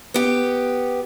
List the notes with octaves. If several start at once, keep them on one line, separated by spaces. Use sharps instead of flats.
B3 G4